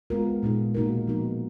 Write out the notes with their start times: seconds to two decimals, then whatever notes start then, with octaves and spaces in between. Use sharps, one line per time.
0.10 G#3 B3 F4 A#4
0.43 A#2 G#3 D#4 G#4
0.74 B2 A#3 D#4 F#4 A#4
1.07 F3 B3 D#4 F#4 A#4